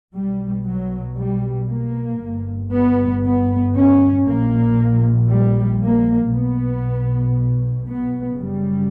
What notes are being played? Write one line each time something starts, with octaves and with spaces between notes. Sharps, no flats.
B1 B2 G3
F#3
G3
A#3
G1 G2
B3
B3
C#4
A#1 A#2 A#3
G3
A#3
B1 B2 B3
B3
F#1 F#2 C#3 G3